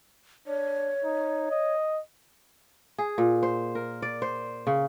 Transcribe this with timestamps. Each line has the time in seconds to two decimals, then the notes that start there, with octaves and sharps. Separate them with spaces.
0.47 D4 C#5
1.04 D#4
1.51 D#5
2.98 G#4
3.18 A#2
3.43 C5
3.75 A#4
4.02 D5
4.22 C5
4.67 C#3